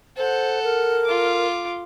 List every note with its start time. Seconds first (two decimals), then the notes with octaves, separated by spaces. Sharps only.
0.17 A4 C5 F#5
0.64 A#4
1.05 F4 D6